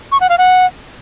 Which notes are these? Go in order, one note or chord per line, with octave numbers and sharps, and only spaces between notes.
C#6
F#5
F5
F#5